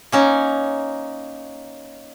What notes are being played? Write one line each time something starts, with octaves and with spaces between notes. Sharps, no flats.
A#3 C#4 D#4